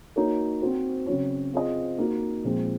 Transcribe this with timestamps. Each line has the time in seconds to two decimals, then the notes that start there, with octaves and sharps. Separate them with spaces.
0.16 A#3 D#4 F#4 A#4 C#5
0.62 C4 F#4 C5
1.06 C#3 F#3 C4 F#4 C#5
1.53 C4 F4 G#4 C5 D#5
1.98 A#3 D#4 F#4
2.44 A#2 F3 G#3 C4